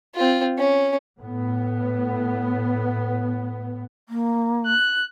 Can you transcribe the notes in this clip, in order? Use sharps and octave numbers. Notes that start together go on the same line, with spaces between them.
C4 F4
C#4
A2 B3
A#3
F#6